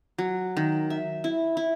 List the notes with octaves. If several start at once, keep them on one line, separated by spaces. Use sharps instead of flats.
F#3
D#3
E5
E4
E4